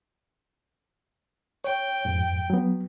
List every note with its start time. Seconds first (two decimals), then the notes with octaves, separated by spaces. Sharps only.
1.64 C#5 G5
2.05 F2 G#2
2.50 F#3 B3